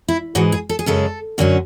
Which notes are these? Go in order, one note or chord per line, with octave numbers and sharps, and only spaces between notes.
E4
G#2 E3 G#3 F#4
G#4
A4
G#4
F#2 C#3 G#3 A4
F#2 D3 F#3 C#4